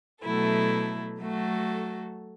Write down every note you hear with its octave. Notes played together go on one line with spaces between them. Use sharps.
B2 F#3 A3 E4 A4
F#3 A3 F#4 A4